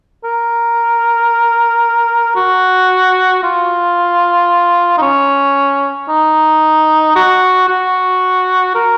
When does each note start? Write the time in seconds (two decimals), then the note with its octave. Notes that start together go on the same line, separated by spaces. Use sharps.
0.24 A#4
2.36 F#4
3.43 F4
4.98 D#4
5.02 C#4
6.09 D#4
7.16 F#4
7.68 F#4
8.75 A#4